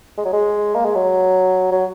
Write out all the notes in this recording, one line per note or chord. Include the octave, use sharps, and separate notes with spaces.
G#3
F#3
G#3
A#3
G#3
F#3
F#3